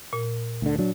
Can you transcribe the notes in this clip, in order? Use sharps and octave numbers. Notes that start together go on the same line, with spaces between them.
A#2
D2 D3
F#3 D4